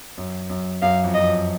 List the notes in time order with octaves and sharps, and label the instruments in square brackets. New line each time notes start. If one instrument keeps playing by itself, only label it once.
[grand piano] F#2
F#2
[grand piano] F#2 [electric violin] F5
[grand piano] F2
[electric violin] D#5
[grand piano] F2
F#2